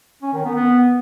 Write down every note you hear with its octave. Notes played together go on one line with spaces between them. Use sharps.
C#4
D#3
B3
B3